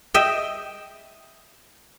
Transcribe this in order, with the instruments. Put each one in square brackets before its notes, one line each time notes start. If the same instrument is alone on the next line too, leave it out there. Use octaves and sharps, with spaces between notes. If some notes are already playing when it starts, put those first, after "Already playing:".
[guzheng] D#5 E5 G5